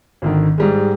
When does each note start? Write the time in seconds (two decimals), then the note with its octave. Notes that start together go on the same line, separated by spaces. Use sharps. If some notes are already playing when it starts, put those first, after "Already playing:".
0.22 G#1 D3 D#3
0.58 G#2 G3 G#3